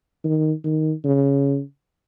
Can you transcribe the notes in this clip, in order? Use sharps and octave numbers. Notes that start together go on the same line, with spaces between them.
D#3
D#3
C#3